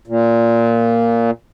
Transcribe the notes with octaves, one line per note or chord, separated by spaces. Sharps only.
A#2